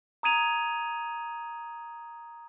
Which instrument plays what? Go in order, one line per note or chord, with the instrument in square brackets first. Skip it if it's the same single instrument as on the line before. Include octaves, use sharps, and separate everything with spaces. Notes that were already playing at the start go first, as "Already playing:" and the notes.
[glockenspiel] A#5 D#6 G#6 D#7 F7